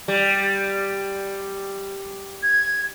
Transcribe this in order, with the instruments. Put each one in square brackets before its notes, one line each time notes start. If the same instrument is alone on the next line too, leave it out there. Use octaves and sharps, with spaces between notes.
[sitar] G3
[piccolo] G#6